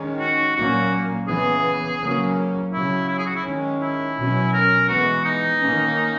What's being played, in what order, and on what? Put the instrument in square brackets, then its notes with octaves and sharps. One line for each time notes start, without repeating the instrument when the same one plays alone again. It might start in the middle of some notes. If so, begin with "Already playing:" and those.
Already playing: [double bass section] D#3 G#3 C#4
[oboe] F#4
[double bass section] A#2 F#3 A#3 C#4 [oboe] F#4
[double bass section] C#3 E3 B3 [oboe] G#4
[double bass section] C#3 F#3 A#3 C#4
[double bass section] C#3 F#3 C#4 [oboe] E4
[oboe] E4
G#4
F#4
E4
[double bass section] D#3 G#3 C#4
[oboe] E4
[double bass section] B2 F#3 C#4
[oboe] A#4
[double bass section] E3 G#3 B3 [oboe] F#4
[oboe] D#4
[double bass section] D#3 A#3 C#4